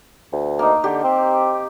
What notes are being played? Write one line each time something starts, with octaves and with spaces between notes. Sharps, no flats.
D2
A#3 D#4
D3 G4
C4